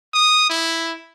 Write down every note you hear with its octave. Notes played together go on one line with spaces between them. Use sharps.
D#6
E4